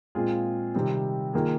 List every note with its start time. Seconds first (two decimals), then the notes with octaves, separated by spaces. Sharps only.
0.15 A#2 G#3 C4 F4 G#4
0.74 C3 D#3 G3 C4
1.34 D#3 A#3 F4 G#4